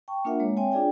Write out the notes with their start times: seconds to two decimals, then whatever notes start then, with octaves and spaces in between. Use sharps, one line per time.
0.08 G5 A5 C#6
0.25 A#3 D4 F4 A#4 E5 F#5
0.40 G#3 A#3 C#5
0.57 C4 C#5 E5 G5 G#5
0.72 D4 F4 G#4 D5 G5